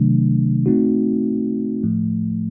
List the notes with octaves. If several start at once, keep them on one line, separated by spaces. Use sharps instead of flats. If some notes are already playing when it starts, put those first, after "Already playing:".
Already playing: C3 D#3 F#3 A3 D4
A3 C4 D#4 F#4
A2 F3 A3